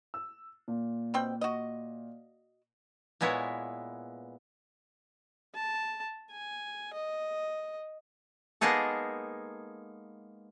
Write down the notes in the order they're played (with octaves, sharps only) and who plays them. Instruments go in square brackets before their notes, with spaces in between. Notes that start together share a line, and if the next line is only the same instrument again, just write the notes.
[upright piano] E6
A#2
[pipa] B2 C4 G5
F#4 D#5
[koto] A#2 G#3 B3 E4 C#5
[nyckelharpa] A5
G#5
D#5
[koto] G#3 A#3 B3 D#4 G#4 A4